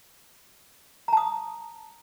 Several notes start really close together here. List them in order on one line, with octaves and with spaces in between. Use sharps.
A#5 A5 D#6